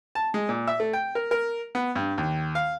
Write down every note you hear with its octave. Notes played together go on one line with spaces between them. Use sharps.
A5
G#3
A#2
E5
A3
G5
A#4
A#4
B3
G2
D#2
F5